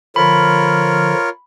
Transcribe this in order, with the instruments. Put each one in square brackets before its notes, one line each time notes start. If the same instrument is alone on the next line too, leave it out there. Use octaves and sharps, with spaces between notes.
[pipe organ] D3 F3 [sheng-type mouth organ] F4 A#4 C#5 [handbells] B5